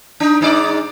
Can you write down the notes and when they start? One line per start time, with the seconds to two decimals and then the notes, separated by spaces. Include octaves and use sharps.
0.20 D4 D#4
0.41 G#2 D#4 D5